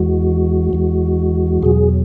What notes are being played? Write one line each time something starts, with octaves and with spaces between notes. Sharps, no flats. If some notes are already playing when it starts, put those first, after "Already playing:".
Already playing: E2 E3 G#3 F#4
E2 E3 G#3
E2 B2 F#3 G#4